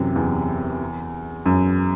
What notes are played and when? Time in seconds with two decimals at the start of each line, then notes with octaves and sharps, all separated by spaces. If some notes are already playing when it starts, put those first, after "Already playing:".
Already playing: F#2 C3 E3
0.16 E2
1.46 F#2